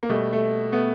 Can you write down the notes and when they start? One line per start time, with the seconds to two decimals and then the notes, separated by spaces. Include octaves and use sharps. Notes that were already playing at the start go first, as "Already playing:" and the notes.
0.03 A#3
0.09 B2 G3 A3
0.33 A3
0.72 A3 B3